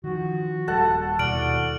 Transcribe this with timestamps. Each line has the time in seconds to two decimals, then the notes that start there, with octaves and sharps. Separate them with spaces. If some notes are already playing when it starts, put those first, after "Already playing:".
0.04 D#3 F3 F#4
0.68 D#1 G3 A4 F#5 A5
1.19 D#2 B2 E4 F#4 D5 F6 D7 F#7